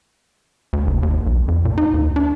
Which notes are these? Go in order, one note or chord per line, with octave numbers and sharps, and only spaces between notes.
D2
F#1
D#2
B1
F2
A#2
D#4
D#2
D4